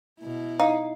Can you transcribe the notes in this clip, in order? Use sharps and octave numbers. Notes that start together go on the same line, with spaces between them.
B2 E4
D#4 F5